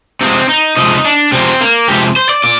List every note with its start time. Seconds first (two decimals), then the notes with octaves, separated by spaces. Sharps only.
0.21 C3 F3 G#3 C4
0.49 D#4
0.77 C3 F3 G#3 D#4
1.04 D4
1.32 C3 F3 G#3 C4
1.61 A#3
1.88 C3 F3 G#3 G4
2.16 C5
2.29 D5
2.44 A#2 D5